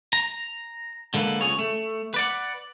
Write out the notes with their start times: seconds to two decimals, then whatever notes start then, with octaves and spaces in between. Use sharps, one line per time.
0.13 A#5
1.14 D3 G#3 A#3 A4 B4
1.41 C#2 G#4 C#5
1.59 A3
2.14 B4 D5 F#5